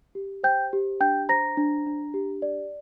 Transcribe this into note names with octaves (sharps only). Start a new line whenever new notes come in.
G4
C5 G5 G6
G4
D4 G5 G6
C5 A#5 A#6
D4
D4
G4
D5